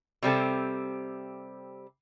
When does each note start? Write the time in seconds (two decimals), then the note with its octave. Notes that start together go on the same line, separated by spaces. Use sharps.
0.22 C3 G3 C4 A4